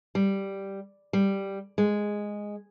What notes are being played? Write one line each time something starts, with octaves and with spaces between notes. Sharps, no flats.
G3
G3
G#3